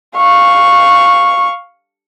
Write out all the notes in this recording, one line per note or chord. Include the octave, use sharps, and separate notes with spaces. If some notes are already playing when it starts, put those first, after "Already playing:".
F5 C#6